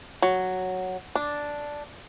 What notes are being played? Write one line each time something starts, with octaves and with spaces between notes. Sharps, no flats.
F#3
D4